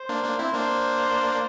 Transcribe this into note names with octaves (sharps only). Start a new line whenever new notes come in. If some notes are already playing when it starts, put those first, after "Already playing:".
Already playing: C5
A#3 D4
A#3 D4
C4 E4
A#3 D4 C5